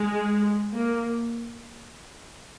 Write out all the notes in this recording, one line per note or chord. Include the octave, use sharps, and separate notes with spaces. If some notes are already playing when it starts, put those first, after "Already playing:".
Already playing: G#3
A#3